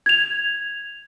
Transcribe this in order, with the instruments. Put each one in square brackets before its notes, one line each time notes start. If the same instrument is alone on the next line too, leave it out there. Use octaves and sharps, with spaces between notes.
[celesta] G#6 F7